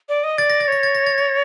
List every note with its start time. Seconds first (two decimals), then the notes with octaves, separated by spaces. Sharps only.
0.09 D5
0.24 D#5
0.38 D5 A6
0.50 A#6
0.60 A6
0.68 C#5 A#6
0.83 A6
0.95 A#6
1.06 A6
1.18 A#6